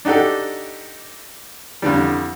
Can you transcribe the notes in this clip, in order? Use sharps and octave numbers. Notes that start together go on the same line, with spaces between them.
D4 D#4 F#4 G4 A4
F2 D3 E3 G3